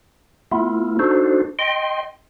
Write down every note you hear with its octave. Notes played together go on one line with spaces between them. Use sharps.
A3 B3 E4 F4
D4 D#4 F#4 A4 C5
D#5 G5 C6